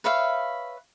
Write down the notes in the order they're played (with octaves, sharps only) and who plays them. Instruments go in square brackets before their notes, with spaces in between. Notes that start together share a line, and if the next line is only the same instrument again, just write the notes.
[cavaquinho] B4 C#5 E5 F5